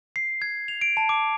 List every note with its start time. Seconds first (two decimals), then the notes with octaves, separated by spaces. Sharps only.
0.16 C7
0.42 G#6
0.68 F7
0.81 D7
0.97 A5
1.09 D6